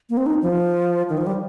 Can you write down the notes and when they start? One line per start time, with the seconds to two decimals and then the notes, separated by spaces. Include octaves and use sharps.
0.10 A#3
0.17 C4
0.26 D#4
0.42 F3
1.09 D#3
1.18 F3
1.27 G3